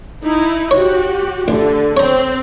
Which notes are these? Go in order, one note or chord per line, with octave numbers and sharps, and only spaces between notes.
D#4 E4
F#4 G4 C#5
A1 D3
C4 C#5 A#5